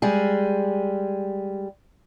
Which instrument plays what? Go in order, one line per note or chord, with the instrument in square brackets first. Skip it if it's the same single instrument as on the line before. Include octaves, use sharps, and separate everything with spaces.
[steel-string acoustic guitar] G3 G#3 G#4